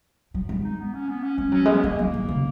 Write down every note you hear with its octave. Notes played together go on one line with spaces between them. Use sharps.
F#3
G#3
D#4
B3
C#4
B3
C#4
G#3 C#4
F#3 C#4
G#3
B3
F#3 A#3
F#3 A#3
D#3
C#3